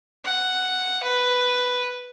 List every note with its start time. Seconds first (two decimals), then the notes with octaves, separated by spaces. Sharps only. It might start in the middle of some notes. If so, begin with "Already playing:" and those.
0.25 F#5
1.03 B4